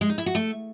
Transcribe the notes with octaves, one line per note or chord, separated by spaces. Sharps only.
G#3
D#4
E4
F#4
A3